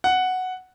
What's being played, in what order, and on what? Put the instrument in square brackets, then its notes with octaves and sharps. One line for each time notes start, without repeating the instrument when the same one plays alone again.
[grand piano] F#5